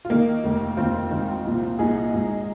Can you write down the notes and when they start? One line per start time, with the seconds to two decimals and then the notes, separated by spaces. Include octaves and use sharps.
0.05 F4
0.09 D#2 D#3 A#3 D#4
0.43 F1 D#2 D#3
0.77 F1 D#2 D#3 C4 F4
1.11 G#1 G#2 D#3
1.44 C2 A#2 F3
1.79 C2 A#2 F3 D#4 G#4
2.12 G#1 G#2 F3